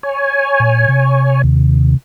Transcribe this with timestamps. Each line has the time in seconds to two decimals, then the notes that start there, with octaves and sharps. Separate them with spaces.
0.03 C#5 G#5
0.60 A#2
0.88 C3
1.44 D#2